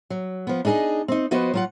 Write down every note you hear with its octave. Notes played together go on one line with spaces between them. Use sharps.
F#3
F3 B3
D4 D#4 G#4 A4 D#5
C4 D#4
F3 B3 F#4 B4 C5 D#5
F#3 F4 F#5